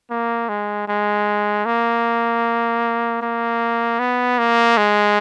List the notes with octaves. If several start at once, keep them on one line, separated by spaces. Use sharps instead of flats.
A#3
G#3
G#3
A#3
A#3
B3
A#3
G#3